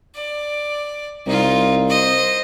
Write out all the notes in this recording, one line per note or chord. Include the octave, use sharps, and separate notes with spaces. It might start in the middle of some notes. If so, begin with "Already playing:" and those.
D5
C2 D#4 F4
C5 D#5